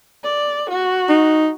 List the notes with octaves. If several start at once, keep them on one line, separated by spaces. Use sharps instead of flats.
D5
F#4
D#4